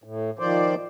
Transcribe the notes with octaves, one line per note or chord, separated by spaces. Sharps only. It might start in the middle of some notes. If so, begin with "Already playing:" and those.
A2
D#3 F3 C5 D5